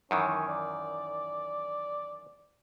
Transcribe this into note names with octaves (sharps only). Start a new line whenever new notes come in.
F#2 D#3 E3 C#4
D5